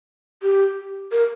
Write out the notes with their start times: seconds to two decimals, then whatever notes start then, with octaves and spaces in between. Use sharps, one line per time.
0.43 G4
1.12 A#4